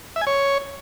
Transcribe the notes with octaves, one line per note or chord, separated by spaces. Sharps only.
E5
G#5
C#5